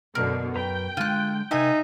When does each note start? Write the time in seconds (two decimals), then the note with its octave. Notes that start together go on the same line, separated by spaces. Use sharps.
0.15 F#2 B2 D3 A#4
0.56 F#2 B4 G5 A#5
0.97 D3 G#3 F4 F#6
1.51 C3 D#4 A#4 E5 G5 G#5